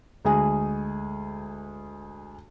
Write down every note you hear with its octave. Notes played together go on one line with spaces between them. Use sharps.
D2 G#3 G#4 G#5